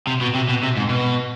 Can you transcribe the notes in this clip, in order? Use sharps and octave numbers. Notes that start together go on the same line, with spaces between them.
C3
B2
C3
B2
C3
G#2
B2